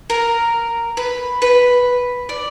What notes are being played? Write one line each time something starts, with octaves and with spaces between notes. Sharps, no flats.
A#4
B4
B4
D5